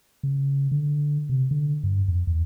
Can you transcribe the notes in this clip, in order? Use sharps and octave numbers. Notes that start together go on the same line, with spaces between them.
C#3
D3
C3
D3
G2
F2
E2